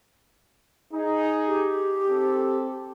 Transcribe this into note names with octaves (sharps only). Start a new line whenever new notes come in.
D#4 G#4
G4
C4 A4